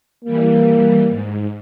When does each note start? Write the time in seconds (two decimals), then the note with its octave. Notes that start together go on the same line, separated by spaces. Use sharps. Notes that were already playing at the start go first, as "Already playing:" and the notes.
0.25 E3 G3 A#3
1.08 G#2